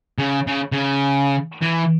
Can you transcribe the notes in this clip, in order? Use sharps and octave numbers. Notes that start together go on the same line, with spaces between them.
C#3
C#3
C#3
E3